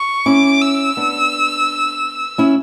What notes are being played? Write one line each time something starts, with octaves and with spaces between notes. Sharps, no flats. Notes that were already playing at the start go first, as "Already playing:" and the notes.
Already playing: C#6
C#4 E4 D6
E6
B3 D4
C#4 E4